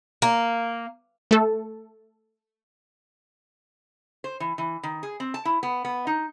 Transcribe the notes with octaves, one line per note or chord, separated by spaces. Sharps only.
A#3
A3 A4
C5
E3
E3
D#3
G#4
C4
A5
E4
B3
B3
D#4